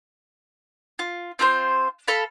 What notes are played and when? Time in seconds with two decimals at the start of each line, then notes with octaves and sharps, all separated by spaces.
0.99 F4
1.39 C4 F4 A4 C5
2.08 A4 F5 B5